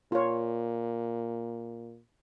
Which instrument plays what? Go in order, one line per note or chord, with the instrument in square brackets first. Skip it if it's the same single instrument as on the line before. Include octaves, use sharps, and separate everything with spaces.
[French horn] A#2 [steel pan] F4 C#5